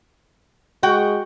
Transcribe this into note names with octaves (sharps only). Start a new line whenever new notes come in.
G#3 F#4 G5